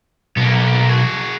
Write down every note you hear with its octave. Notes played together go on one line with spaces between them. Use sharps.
B1 A#3 B3
F#4 G#4